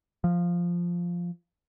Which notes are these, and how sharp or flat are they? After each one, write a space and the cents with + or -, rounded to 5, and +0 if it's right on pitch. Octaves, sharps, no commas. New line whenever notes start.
F3 +0